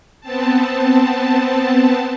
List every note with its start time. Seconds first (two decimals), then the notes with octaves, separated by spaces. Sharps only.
0.21 B3 C4 A5